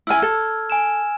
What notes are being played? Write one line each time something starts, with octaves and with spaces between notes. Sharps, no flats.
E4 G#5 E6 F6 G#6
A4
G#5 D7 E7